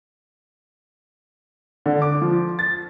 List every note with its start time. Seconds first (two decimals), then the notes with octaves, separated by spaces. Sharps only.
1.86 D3
2.02 D6
2.21 F3
2.59 A6